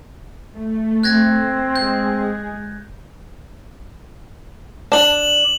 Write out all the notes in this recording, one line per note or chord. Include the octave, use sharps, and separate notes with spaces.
A3
C4 F#6 G#6 A#6
G#3 G#4 G6
D4 E7 F#7